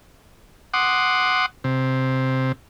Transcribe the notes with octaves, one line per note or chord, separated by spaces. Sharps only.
F#5 C6 D6 D#6
C3